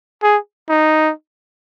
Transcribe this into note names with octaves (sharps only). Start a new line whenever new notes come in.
G#4
D#4